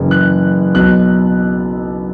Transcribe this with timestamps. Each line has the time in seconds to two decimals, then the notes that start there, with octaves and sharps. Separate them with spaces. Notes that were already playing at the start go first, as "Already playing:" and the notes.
Already playing: F#1 F#2 C#3 E3
0.11 F#6
0.75 B1 B2 F#6